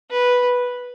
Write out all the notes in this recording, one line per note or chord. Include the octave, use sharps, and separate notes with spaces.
B4